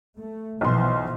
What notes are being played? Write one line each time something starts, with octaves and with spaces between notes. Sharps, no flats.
A3
B1 B2 E3 F3 C6